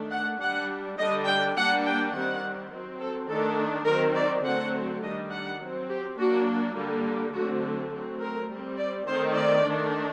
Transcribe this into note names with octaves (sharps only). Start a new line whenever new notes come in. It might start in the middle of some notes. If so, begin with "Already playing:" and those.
Already playing: D#3 A3 D4
F#5
G3 D4 F#5
D3 G3 D4 D#5
G5
G3 A#3 D4 F#5
G5
D#3 G3 C4 F#5
F#3 C4
A4
D#3 A3 D4 A4
D#3 F#3 C4 A#4
D5
D3 F#3 A3 C4 F#5
D#3 G3 D4 D#5
F#5
F#3 C4
G4
F#3 A#3 D4 F#4
D3 G3 A#3
D3 F#3 A3 C4 F#4
F#3 A3 C4
A#4
G3 C4
D5
D#3 A3 C4 C5
D5
D#3 A3 D4